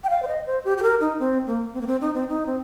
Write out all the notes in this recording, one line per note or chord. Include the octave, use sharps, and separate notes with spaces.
G5
F5
C5
D#5
C5
G4
G4
A#4
D#4
C4
A#3
C4
A#3
C4
D#4
C4
D#4
C4